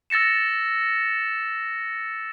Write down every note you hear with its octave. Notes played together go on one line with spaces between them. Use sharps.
E6 A6 A#6 C#7 E7